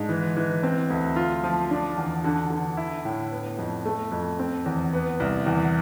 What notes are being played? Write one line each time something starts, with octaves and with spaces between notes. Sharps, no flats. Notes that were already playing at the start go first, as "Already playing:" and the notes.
Already playing: G#2 D4
E3
E3
C4
D2
F4
F3
D4
E2
D3
D3
E4
A2
B3
F2
A3
F2
C4
E2
B3
C2
E2